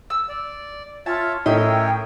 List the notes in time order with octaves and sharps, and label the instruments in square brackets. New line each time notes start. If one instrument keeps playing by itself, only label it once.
[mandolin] E6
[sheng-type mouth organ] D5
[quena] F4 [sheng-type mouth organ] C#5 E5 [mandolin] A5
[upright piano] A2 [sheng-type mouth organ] C#4 A#4 C#5 [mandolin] D#5 E5 [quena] G5